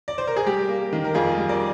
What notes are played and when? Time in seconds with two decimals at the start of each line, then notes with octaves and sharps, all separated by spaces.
0.08 D5
0.18 C5
0.27 A#4
0.36 G#4
0.46 G3 G4
0.69 A#3
0.93 D#3
1.04 A#4
1.14 F2 F4 G#4
1.37 G3
1.49 A#4 D5